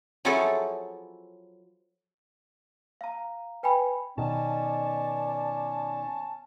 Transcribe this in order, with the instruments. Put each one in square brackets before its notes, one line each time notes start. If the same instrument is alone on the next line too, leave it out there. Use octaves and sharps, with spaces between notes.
[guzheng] F3 F#3 E4 G#4 A4 C#5
[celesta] F5 A#5
B4 G5 G#5 B5
[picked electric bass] B2 D#3 [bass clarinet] C#4 [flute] D5 [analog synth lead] A5